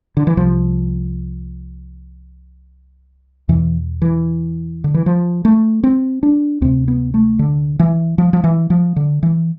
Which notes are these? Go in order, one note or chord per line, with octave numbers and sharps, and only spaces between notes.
D3
E3
C2 C3 F3
E2 B2 E3
E3
D3
E3
F3
A3
C4
D4
D2 C3 C4
B3
A3
D3
E3
F3
F3
E3
F3
D3
E3